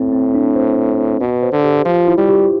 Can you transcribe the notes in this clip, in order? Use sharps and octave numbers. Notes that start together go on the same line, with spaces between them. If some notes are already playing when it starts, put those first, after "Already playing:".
Already playing: A2 C4
C4
D4
C5
B2 B4
C5
D3
G4
F3 F4
E4
G3
G4